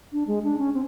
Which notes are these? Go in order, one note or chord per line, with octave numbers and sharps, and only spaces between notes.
D4
G#3
D4
C#4
C4